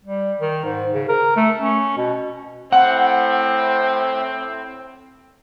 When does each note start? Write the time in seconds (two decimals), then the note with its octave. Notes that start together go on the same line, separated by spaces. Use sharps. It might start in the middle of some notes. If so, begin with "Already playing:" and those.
0.05 G3
0.41 D#3
0.65 G#2
0.93 C#3
1.08 A#4
1.36 A3
1.60 C#4
1.97 B2
2.72 A2 C4 F#5